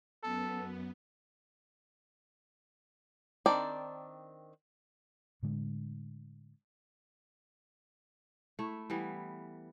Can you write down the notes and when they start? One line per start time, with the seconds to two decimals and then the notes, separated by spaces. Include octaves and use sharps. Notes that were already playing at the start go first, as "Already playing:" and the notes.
0.23 F#2 B3 A4
3.46 D#3 C4 D4 D5
5.43 A2 D3 G#3
8.59 A3 E4
8.90 E3 G3 B3